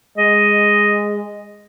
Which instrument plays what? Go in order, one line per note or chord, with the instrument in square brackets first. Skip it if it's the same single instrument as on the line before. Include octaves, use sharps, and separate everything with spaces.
[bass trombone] G#3 [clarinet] D#5